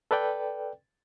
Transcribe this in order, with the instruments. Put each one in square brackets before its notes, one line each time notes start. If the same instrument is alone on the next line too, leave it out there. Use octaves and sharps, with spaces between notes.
[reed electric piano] A4 B4 D5 G5